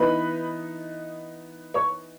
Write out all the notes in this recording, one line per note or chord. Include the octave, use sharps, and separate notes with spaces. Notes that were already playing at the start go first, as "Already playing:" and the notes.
Already playing: E3 B3 D#4 B4 B5
C#5 C#6